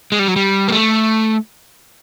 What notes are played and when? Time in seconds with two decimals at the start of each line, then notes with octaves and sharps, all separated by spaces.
0.12 G#3
0.19 G3
0.28 F#3
0.36 G3
0.68 A#3
0.72 A3